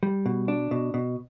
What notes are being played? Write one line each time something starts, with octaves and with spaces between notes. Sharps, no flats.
G3
B2
D4
B2
B2